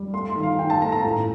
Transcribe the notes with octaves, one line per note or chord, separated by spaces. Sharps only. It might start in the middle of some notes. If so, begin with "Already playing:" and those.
Already playing: G3
A3 C6
C6
D#3
F5
D#3 G5
A5
A3 A#5
A#5
A2